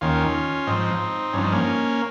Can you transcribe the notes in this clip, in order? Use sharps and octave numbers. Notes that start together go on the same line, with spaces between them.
D#2 D#3 C#4 F4
G#2 F3 C4 D#4
G2 F3 C#4
D#4
A#3 C#4